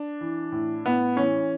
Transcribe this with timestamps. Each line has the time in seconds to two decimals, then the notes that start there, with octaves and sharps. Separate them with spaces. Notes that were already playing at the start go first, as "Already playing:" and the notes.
Already playing: D4
0.21 E3
0.52 A2
0.85 A2 B3
1.17 E3 C#4